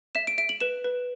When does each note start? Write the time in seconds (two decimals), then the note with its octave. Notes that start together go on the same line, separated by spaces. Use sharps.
0.15 E5 E7
0.27 D7
0.38 E5 D7
0.49 F#7
0.60 B4 E7
0.84 B4